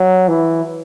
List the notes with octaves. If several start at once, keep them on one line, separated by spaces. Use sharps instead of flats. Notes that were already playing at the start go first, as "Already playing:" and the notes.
Already playing: F#3
E3